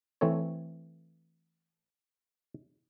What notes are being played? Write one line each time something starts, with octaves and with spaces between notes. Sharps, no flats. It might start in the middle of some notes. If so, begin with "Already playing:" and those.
E3 A3 C4 A4 C#5